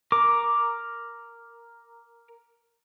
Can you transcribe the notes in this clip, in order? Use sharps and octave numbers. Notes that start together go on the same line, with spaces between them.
A#4 D6